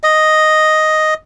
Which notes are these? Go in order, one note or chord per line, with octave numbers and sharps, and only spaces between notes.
D#5